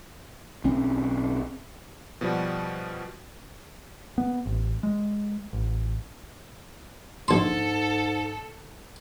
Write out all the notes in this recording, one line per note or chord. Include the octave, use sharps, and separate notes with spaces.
B1 C4 C#4
B2 F3 G3 F#4
B3
A1
G#3
A1
A#1 G#2 A4 C6